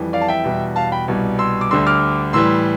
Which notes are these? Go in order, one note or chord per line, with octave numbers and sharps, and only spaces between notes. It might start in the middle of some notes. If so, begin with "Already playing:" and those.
Already playing: F2 E3 G3
D5 F5
A5
E5 G5
E2 B2 G3
F5 A5
G5 B5
C2 B2 G3
C6 E6
D6
D2 D3 G3 C6 E6
D6 F6
A2 E3 G3 C6 E6